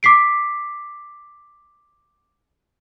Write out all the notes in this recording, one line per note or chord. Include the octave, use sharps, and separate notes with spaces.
D6 B6 C7 D7